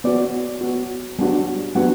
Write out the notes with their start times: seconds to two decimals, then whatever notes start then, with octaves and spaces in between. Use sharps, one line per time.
0.04 B3 F#4 D5
0.61 B3 F#4
1.19 G3 B3 D4 F#4
1.75 G3 B3 D4 F#4 F#5